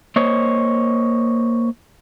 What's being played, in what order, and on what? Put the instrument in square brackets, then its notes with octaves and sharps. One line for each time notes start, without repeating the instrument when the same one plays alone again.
[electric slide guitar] A#3 C5 C#5 D#5